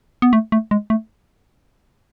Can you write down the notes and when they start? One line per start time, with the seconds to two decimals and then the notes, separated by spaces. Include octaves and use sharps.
0.22 B3
0.33 A3
0.52 A3
0.71 G#3
0.90 A3